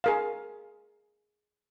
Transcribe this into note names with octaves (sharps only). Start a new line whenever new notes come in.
G#4 A#4 F5